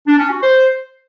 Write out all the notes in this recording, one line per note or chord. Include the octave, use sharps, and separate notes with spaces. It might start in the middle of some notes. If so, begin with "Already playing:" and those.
D4
C#4
F#4
C5